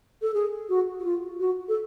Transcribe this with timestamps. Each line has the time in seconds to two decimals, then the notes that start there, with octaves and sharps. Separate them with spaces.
0.22 A4
0.34 G#4
0.69 F#4
0.99 F#4
1.04 F4
1.40 F#4
1.68 A4